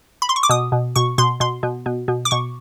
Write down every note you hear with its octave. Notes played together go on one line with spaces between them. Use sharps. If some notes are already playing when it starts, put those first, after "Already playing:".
B5
C6
C#6
D6
B2 D#6
B2
B2 C#6
B2 C6
B2 C6
B2
B2
B2
D6
B2 C#6